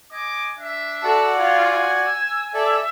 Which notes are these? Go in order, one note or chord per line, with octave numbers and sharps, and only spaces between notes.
D#5 G#5 D6
D4 E5
F#4 A4 D5 F#5
F4 G#5
E6
A4 D5 E5